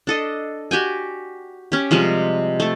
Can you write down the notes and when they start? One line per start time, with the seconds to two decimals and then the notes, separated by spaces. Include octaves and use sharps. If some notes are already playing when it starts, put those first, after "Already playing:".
0.07 D4 A4 D#5
0.71 F#4 G4 G5 G#5
1.72 C#4 G4
1.91 C3 F3 G3 G#3
2.60 A3 A4